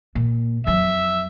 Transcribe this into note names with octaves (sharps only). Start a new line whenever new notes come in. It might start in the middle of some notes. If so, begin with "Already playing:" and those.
A#2
F2 F#3 E5